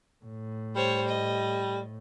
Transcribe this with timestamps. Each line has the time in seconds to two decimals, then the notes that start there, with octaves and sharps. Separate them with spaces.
0.25 A2
0.76 G3 C5 C#5
1.09 D#5